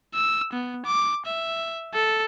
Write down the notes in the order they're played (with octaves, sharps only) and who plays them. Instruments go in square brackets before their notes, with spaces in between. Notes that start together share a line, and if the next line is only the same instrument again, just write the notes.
[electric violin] E6
B3
D6
E5
A4